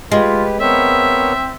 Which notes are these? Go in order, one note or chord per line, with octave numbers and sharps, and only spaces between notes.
G#3 F4 G4 B4
B3 C4 A#4 C#5 E5